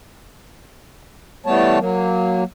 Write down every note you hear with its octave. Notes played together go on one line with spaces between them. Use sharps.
E3 G3 A3 B3 C#5 A5
F#3 A#3